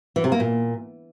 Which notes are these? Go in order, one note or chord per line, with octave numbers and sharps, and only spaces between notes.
E3
C3
A#3
A#2